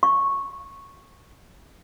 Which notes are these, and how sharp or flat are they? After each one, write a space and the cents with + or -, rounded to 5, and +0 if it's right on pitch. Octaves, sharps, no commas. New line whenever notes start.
C#6 -10